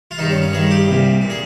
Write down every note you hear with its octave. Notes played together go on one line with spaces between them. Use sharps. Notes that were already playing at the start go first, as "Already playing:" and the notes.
F4
G2 D#3 D#4
C#4
C#4
G2 D#3 G#4
G4
C2 A#2
A#2
G#4